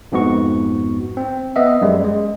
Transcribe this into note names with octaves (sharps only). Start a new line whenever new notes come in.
F2 G#2 B3 F#4 C#6
C4
B3 D#5 E5
F#2 G3 G#3
G#3